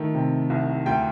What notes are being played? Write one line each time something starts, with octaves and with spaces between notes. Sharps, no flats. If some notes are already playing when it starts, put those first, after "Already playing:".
Already playing: D#3 A3
C3
C2
D2 G5